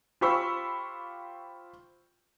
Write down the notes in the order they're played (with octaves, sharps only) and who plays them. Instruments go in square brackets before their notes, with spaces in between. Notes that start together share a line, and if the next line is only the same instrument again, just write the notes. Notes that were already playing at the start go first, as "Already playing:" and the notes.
[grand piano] F4 G4 C5 B5 C#6 E6